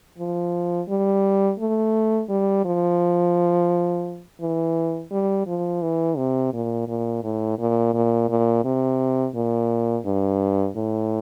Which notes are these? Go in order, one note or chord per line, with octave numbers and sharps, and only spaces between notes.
F3
G3
A3
G3
F3
E3
G3
F3
E3
C3
A#2
A#2
A2
A#2
A#2
A#2
C3
A#2
G2
A2